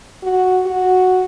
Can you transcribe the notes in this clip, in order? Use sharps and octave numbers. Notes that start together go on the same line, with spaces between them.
F#4
F#4